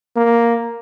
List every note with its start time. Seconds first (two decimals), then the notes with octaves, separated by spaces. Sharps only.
0.17 A#3